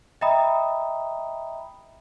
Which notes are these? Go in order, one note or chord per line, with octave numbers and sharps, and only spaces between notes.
D#5 E5 G5 A#5 B5 D#6